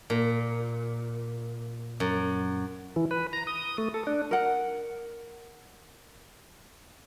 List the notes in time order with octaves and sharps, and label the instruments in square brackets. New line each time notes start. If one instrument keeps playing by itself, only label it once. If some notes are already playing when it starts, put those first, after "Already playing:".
[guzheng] A#2
F#2
[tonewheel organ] E3
B4
A#5
D#6
A3
A4
D4
[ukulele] A#4 F#5